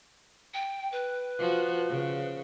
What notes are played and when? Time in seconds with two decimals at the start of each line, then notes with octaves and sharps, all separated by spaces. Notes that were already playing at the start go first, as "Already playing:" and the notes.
0.54 G5
0.92 B4
1.39 F3 F#4
1.90 C#3